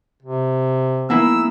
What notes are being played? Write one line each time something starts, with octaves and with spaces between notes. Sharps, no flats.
C3
G#3 A#3 B3 E4 E6